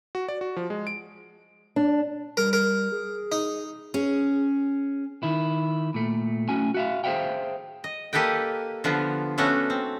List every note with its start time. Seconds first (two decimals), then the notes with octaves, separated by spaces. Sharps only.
0.15 F#4
0.28 D5
0.41 F#4
0.56 F3
0.70 G#3
0.87 D7
1.76 D4
2.37 G3 A#4
2.53 A#4
2.92 G#4
3.32 D#4
3.94 C#4 G#4
5.23 D#3 E4
5.94 A#2 A3
6.49 A3 C#4 F#4 G#5
6.74 F#4 E5 F5
7.04 G#4 C5 C#5 E5 F5 G5
7.84 D#5
8.13 A#3 G4 A4 B4 D#5 G5
8.84 D3 F3 B3 F4
9.38 A3 B3 C#4 D4 F#4 A4
9.70 C4